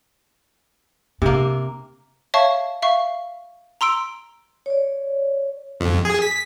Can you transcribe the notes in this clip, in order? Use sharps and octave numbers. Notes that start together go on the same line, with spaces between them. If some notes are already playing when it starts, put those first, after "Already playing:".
C3 A#3 D4
C#5 E5 F5 A5 C#6
E5 F5 C#6
A#5 C6 E6 D7
C#5 D5
F2
G#4
B6